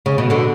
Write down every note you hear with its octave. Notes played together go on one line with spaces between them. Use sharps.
C#3
B2
B2 D3